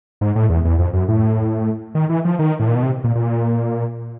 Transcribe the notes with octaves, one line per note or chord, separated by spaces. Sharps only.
G#2
A2
E2
E2
F2
F#2
A2
D#3
E3
F3
D#3
A2
A#2
B2
C3
A#2
A#2